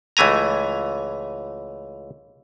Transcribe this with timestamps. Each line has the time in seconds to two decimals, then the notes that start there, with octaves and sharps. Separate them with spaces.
0.17 C#2 E3 A3 G#5 A#5